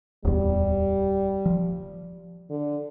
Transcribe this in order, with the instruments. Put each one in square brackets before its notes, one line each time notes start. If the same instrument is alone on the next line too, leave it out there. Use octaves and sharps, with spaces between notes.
[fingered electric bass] D1 E2 [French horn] G3
[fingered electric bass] F3
[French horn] D3